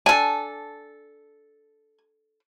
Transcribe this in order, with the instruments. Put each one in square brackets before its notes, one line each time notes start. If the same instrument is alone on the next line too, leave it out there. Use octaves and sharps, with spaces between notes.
[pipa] D4 A4 [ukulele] G#5